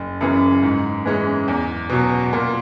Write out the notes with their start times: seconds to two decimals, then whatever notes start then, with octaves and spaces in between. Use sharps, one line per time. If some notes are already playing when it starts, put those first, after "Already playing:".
Already playing: F#1
0.21 F#2 C#3 E3
0.63 G#2
1.05 E3 G#3 C#4
1.48 E2
1.89 B2 F#3
2.33 A#2